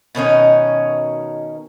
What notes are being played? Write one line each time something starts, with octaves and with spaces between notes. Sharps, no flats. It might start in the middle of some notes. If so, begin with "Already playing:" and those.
B2 D#3 C#4 D#4